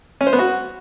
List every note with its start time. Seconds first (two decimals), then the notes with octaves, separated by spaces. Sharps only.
0.21 C#4
0.27 C5
0.33 B3
0.39 F#4